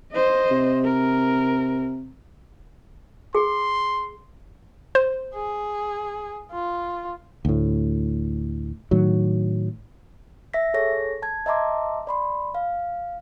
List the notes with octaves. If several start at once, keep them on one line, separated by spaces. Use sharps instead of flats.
C5 D#5
C3
A#4
G#4 C6
C5
G#4
F4
D2 A2
A2 D#3 F#3
E5 A#6 B6
G#4 A4 C#5 A#6
A5 G#6
D#5 E5 A5 A#5 C6 D6
D5 B5 C6
F5